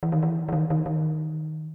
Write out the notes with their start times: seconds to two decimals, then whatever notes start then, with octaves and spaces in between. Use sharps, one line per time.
0.03 E3
0.12 D#3
0.23 E3
0.49 E3
0.53 D#3
0.70 D#3
0.86 D#3